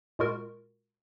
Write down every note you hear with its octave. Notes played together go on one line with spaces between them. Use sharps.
A#2 G#3 F4 F#4 A#4